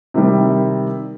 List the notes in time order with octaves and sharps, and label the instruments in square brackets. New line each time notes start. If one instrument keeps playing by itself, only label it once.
[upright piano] C3 D#3 G3